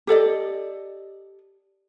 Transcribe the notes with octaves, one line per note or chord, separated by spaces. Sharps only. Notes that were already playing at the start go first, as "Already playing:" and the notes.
G4 A4 D5 D#5